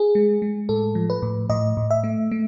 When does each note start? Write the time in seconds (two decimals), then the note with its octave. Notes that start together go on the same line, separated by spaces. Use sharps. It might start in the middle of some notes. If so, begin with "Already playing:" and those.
Already playing: G#4
0.15 G#3
0.42 G#3
0.69 A2 A4
0.95 F3
1.10 B4
1.22 A2
1.50 A2 D#5
1.77 A2
1.91 E5
2.04 A3
2.31 A3